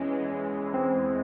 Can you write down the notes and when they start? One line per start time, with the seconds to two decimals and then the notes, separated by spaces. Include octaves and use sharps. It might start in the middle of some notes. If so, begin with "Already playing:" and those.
Already playing: E2 E3 G#3 C#4
0.74 C4